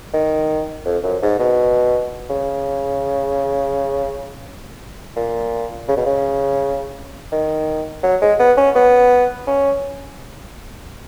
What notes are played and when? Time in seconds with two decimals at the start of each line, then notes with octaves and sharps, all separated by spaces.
0.14 D#3
0.86 F2
1.04 F#2
1.22 G#2
1.39 B2
2.30 C#3
5.16 A#2
5.89 C#3
5.97 B2
6.06 C#3
7.32 D#3
8.03 F#3
8.22 G#3
8.40 B3
8.58 C#4
8.75 B3
9.47 C#4